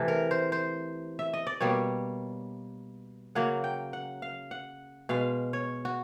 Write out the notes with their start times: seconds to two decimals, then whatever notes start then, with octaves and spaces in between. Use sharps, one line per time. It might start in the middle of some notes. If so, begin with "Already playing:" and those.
Already playing: C3 E3 A3
0.08 A#4
0.31 C5
0.52 C5
1.19 E5
1.34 D#5
1.47 D5
1.61 B2 G3 A#3 C#5
3.35 C#3 F#3 A#3 F#5
3.64 G5
3.93 F#5
4.22 F5
4.51 F#5
5.09 B2 G#3 F5
5.53 C#5
5.85 F#4